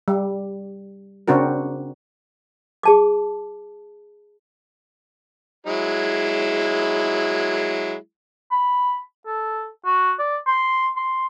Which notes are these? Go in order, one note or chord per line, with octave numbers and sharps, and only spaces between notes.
G3
C#3 C4 D4 F#4 A#4
G#4 A5 D6
F#3 G#3 E4
B5
A4
F#4
D5
C6
C6